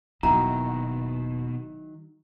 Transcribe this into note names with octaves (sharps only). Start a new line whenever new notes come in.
E1 B2 D#3 F#3 A#3 E4 A#5